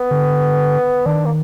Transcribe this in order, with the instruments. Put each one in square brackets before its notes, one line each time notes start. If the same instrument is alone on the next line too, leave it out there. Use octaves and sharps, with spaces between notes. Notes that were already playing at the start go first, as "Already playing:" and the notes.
Already playing: [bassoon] B3
[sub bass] D3
[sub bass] D#3 [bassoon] D4
[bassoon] A#3